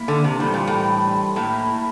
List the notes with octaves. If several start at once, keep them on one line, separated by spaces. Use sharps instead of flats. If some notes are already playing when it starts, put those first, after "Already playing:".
Already playing: A#3 E4 A#4
D3
C3
A2 E3 G3 D4 G4 C5
A#2
A2
A2 A#3 E4 A#4